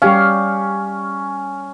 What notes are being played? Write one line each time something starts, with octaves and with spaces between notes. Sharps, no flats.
G3 C#4 G4 F5